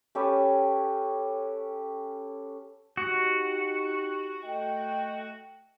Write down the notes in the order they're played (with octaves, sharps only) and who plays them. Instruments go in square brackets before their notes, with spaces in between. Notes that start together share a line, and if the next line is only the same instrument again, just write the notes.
[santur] C#4 G4 A4 B4
[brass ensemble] D#4 G4 [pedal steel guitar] F#4
[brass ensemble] A3 D#5 G5